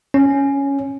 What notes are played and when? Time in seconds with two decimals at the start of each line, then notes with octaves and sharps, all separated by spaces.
0.14 C#4